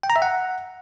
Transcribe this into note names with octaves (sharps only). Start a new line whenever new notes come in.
G5
A#5
E5
F#5